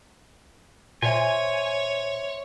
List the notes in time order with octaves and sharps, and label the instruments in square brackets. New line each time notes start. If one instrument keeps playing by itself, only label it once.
[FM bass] A#2 [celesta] C5 E5 C6 [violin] C#5 [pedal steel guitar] G#5